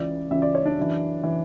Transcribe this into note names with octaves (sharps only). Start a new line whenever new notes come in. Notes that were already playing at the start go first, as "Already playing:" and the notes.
Already playing: C#2 C#3 E3 D5
C#2 C#3 E3 E5
D5
C#5
D4
F#2 E3
E3